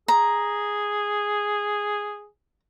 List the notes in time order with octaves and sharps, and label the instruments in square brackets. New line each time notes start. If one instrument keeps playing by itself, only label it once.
[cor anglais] G#4 [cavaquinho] A#5